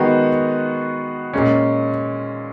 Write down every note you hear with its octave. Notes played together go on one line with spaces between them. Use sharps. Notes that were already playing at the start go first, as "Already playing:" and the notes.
Already playing: D#3 G#3 B3 F#4
A#2 G#3 C#4